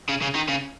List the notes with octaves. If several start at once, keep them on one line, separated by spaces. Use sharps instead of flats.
C#3
C#3
D#3
C#3